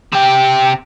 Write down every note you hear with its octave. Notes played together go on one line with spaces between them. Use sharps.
C3 G4